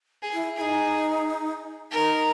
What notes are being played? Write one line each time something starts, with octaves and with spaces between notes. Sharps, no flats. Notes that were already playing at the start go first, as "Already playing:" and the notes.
G#4
E4
D#4 E4 G#4
D#4 A#4